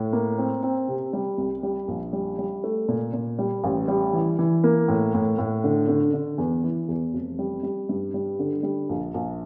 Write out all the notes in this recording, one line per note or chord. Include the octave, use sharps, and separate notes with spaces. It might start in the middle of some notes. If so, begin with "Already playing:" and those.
Already playing: A2
A#3
C4
C4
C3
G3
C2
G3
A#1
G3
G3
A3
A#2
A#2
G3
A1
G3
E3
E3
A#3
A2
A2
A2
D3
D3
D3
E2
E3
E2
F1
G3
G3
G2
G3
D3
G3
A#1
A#1